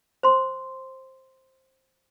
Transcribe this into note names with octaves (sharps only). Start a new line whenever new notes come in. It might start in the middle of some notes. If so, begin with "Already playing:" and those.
C5 C6